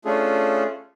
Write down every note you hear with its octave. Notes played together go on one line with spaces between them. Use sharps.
A3 C#4 D4 F4 G#4 A4